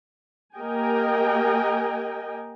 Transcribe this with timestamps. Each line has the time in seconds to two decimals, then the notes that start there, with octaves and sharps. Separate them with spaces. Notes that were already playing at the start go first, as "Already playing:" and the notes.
0.56 A#3 G4 A#4 D#5 G5 G#5